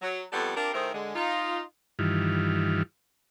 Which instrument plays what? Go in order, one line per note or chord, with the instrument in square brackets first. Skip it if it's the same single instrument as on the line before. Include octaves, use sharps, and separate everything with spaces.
[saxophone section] F#3
F2 G3 B3 F#4 A4
C4 D4 F4 G4 A#4
D#3 A3 E4 G#4 A#4 C5
D3 G#3
D#4 F4
[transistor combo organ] G2 D#3 E3 F4